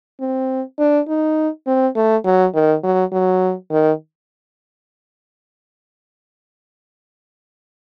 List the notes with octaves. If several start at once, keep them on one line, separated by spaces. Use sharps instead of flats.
C4
D4
D#4
C4
A3
F#3
D#3
F#3
F#3
D#3